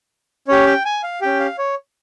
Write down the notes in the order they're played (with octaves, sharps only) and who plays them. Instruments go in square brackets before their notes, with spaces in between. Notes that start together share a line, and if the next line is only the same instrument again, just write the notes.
[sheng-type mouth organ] C#4 G4 C#5
G5
G#5
F5
C#4 G4 G5
F5
C#5